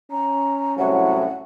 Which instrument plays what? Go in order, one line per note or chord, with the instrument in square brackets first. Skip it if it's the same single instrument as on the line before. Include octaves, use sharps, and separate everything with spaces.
[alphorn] C#4 [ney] A#5
[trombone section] C2 A2 F#3 [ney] F#5